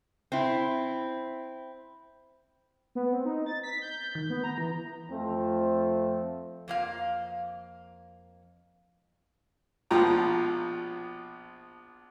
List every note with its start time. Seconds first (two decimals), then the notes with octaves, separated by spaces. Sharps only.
0.32 C4 E4
2.95 B3
3.13 C4
3.25 D#4
3.46 A6
3.63 B6
3.82 G6
4.15 D#3
4.30 B3
4.44 A#5
4.58 E3
5.10 F2 F3 A3 C4
6.68 F2 A#3 F5
9.91 A#1 B2 F3 F4 G5 A#5